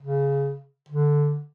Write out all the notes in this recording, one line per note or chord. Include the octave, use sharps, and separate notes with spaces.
C#3
D3